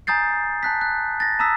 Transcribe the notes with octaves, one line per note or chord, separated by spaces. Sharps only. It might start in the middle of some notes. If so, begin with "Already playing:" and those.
G#5 A#5 D#6 G6 A6 C7
A5 F#6 B6
F#6
A6 A#6
A5 A#5 D#6 E6 B6